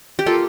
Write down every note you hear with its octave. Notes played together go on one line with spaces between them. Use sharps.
G4
A#3 F4 A4